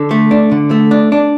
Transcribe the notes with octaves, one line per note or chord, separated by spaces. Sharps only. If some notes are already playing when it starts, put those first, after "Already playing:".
Already playing: D3 A4
A3
D4
D3
A3
D4
D4